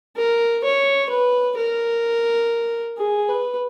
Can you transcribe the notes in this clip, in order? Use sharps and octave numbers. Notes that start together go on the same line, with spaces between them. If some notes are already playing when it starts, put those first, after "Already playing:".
A#4
C#5
B4
A#4
G#4
B4